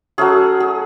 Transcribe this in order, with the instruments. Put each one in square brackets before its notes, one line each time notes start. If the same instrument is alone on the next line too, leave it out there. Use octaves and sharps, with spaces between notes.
[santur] F#3 A3 C#4 G#4
G#4